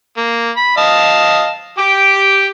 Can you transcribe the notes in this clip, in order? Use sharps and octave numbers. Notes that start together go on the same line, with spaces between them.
A#3
B5
D#5 F5 A5
G4 G5 D6